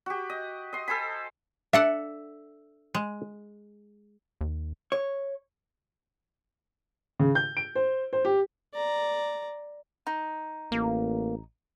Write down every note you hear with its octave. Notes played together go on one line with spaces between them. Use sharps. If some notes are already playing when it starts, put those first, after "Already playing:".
F#4 G4
D#5
D#5 C6
A4 C5 G#5 B5
D4 A4 E5 F#5
G#3
D#2
C#5
C#3
G6
D7
C5
C5
G4
D5 A#5
D#4
A1 A#3